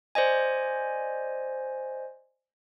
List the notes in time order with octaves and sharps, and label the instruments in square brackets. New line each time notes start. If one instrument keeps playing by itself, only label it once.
[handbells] C5 D5 D#5 G#5